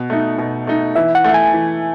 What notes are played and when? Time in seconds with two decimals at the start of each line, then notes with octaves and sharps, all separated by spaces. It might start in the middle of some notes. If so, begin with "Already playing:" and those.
Already playing: B2
0.10 A3 D#4
0.38 B2
0.67 A3 D#4
0.95 E3 E5
1.15 F#5
1.24 A3 E4
1.34 G#5
1.53 E3